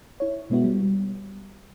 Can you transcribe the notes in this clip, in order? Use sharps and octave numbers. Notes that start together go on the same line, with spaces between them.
E4 C#5
B2 G#3 B3 E4 F#4
G3